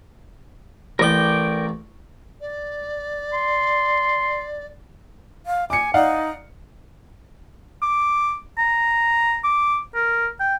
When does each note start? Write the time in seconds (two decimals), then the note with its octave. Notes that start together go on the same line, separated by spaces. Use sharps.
0.99 A1 A#4 D5 G5 D6
2.41 D5
3.33 C6
5.46 F5
5.70 G#5 D6 C#7
5.94 D#4 D5 F5 F#5
7.82 D6
8.58 A#5
9.44 D6
9.95 A#4
10.40 G5